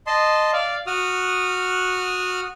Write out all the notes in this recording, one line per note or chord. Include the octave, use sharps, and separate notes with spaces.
D#5 A5 C6
D5 F5
F#4 D#6 F6